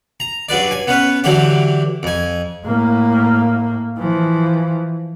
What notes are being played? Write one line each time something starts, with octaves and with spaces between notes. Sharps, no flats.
A#5
G2 F#3 B4 D5
G#5
B3 C#4 B4
D3 E3 F#3 G4 D6
F2 G#5
A2 A#3
E3 F3